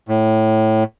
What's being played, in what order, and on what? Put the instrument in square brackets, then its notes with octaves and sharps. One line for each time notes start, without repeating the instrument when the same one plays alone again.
[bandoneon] A2